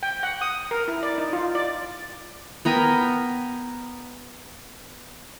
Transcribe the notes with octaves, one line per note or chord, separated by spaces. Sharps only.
G5
F#5
D#6
A#4
E4
D5
D#4
F4
D5
B3 A#4 G5 G#5